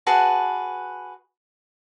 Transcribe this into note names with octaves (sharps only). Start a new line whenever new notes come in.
F#4 G#4 B4 A5